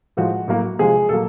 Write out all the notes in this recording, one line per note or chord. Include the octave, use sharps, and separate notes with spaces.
A2 F3 G#3 F#4
A2 F#3 A#3
C3 F3 G#3 G#4
A#2 F#3 A#3 A4